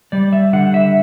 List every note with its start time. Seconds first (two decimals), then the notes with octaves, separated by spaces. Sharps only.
0.12 G3 D5
0.33 E5
0.53 D3 F#5
0.74 E5